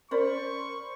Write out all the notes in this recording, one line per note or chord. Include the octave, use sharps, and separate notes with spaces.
C#4 A#4 C5 D5 B5 C#6